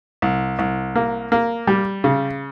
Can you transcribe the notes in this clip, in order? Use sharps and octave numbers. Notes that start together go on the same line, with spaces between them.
C2
C2
A#3
A#3
G3
C#3